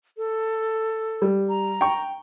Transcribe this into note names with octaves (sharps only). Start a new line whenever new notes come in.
A4
G3
A#5
G5 C#6